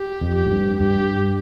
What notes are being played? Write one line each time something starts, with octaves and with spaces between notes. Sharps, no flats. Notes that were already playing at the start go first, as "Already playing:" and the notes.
Already playing: G4
F2
G4
G#2
G2
G2 G4